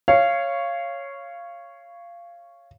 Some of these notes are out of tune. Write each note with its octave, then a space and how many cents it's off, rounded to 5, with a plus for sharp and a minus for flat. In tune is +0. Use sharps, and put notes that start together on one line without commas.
C#5 +0 F5 -20